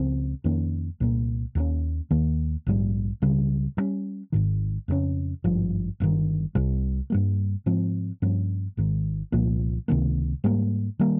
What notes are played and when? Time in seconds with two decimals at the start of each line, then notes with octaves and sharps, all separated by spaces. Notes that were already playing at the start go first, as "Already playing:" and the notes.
Already playing: C#2 C#3 F3 C4
0.44 F2 D#3 A#3 C#4
1.00 C2 A#2 F3 A#3
1.55 D#2 D#3 A#3 C#4
2.11 D#2 D#3 A#3
2.67 A#1 G#2 G3
3.22 C#2 C#3 G3
3.77 G2 G3 C#4
4.32 G#1 G#2 D#3
4.88 F2 C#3 G#3 C#4
5.44 G#1 G2 F3
6.00 G1 G2 D#3
6.55 C2 C3 G3
7.10 G2 G3 A#3
7.66 G#2 F3 C4
8.22 G2 F3 A#3 C#4
8.77 G#1 G#2 D#3
9.32 C2 A#2 F3 A#3
9.88 C#2 C3 D#3 A#3
10.44 G#2 G3 A#3
10.99 D#3 G3 A#3